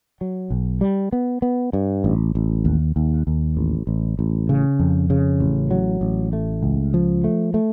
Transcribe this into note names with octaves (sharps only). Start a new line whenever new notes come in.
F#3
B1
G3
B3
B3
G2
A1
A1
D#2
D#2
D#2
A1
A1
A1
C#3
F2
C#3
A1
F#3
A1
A3
C#2
F3
A3
A3